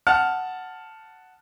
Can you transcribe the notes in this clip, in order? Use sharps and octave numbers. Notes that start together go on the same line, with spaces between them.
F#5 A5 F6